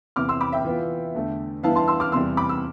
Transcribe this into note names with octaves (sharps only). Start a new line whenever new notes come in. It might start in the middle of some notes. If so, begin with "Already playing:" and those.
E2 C3 E3 D6 F6
C6 E6
B5 D6
E5 G5
E3 B3 F4
E2 D3 A3
G2 E3 B3 E4 F5 A5
A5 C6
C6 E6
D6 F6
E2 C3 E3 G3 C6 E6
B5 D6
E6